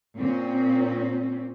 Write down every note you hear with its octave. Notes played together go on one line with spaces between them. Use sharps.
A#2 C4 C#4